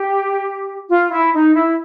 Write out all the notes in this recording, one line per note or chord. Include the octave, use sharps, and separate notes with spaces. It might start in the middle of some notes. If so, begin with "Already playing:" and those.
Already playing: G4
F4
E4
D#4
E4